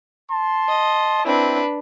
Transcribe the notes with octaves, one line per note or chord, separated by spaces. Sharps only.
A5 C6
D#5
C4 D4 E4 B4